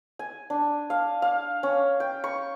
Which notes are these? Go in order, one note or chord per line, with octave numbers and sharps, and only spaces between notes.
G#5
D4
F5
F5
C#4
G5
C#6